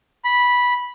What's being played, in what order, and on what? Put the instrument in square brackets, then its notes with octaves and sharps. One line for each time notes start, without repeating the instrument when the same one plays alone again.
[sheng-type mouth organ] B5